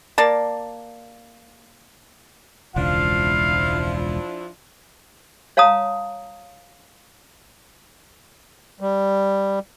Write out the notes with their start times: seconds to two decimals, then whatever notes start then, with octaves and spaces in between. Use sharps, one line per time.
0.18 A#3 D5 A5
2.76 E1 C#2 F3 D4 E4 F5
5.57 C#5 F5 A5 A#5 D#6
8.81 G3